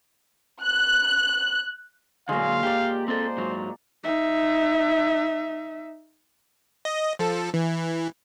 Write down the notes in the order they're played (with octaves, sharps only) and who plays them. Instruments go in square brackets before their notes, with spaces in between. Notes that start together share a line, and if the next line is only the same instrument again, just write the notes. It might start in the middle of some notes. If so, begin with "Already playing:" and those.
[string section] F#6
[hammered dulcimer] A#2 G#3 [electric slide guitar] D3 F#3 [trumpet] F5
[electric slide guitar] G4 [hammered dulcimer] D5 A#5
[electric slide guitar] C4 A4 [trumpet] C5
[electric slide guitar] G#2 F#3
[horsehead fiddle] D#4 E5
[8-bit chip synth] D#5
F3 A4
E3